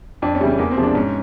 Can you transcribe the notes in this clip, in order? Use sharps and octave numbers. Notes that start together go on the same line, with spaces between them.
F2 D4
C#4
C#3 E3 G3
C#4
E2 A#3
C4
C3 F3 G#3
D4
G#2 C#4